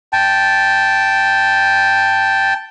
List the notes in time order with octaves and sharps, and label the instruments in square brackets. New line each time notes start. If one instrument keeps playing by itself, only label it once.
[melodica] G5 A5